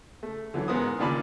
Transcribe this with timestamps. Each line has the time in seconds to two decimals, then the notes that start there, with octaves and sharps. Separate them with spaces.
0.23 A3
0.54 D3 E3 F#3
0.68 G#2 B3 A#4 C5 D#6
0.99 G2 A#2 D#3 D5 A5 B5